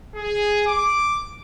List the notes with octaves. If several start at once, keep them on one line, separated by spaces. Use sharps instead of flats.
G#4
D6